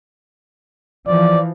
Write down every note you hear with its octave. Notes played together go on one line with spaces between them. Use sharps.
E3 F3 D5